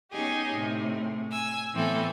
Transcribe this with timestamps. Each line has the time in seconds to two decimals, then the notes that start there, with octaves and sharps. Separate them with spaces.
0.11 B3 C#4 D#4 G4 G#4 D#5
0.53 A2 C3
1.31 G#5 E6
1.73 A2 E3 B3 C4 E4 A4